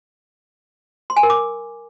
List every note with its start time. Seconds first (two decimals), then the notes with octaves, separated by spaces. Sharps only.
1.10 C6
1.17 G#5
1.23 A#4
1.30 D6